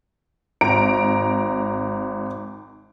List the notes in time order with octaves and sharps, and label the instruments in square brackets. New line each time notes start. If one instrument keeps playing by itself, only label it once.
[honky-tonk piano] G#1 A#5 D7